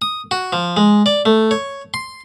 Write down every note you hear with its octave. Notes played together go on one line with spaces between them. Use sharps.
D#6
F#4
F3
G#3
D5
A3
C#5
C6